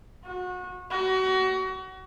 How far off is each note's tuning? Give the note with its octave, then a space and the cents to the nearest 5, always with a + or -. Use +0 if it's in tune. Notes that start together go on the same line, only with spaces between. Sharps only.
F#4 -30
F#4 +30